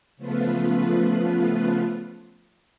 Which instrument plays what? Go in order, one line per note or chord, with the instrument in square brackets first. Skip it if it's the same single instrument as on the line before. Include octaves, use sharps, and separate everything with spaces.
[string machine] C#3 F3 A3 B3 F4 B4